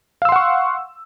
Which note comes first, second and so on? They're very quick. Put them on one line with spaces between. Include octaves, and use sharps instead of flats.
F5 E6 C6 F#5 C#6